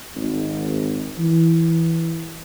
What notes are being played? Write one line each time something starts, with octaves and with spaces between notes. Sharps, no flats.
G#1
E3